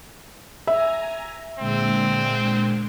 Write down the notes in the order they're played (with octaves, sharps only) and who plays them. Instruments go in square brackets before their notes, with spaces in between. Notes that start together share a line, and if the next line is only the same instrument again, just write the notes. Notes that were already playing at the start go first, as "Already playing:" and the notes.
[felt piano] E5 [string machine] G#5 A#5
[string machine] A#2 D3 G#3 [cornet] C4